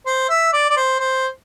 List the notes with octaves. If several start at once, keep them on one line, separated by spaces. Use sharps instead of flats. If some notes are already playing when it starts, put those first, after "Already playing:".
C5
E5
D5
D5
C5
C5